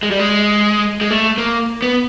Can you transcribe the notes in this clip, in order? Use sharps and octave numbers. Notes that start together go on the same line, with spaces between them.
G#3
G3
G#3
G#3
A3
A#3
B3